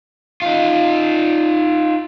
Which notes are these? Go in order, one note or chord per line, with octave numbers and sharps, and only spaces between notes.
D#4 F4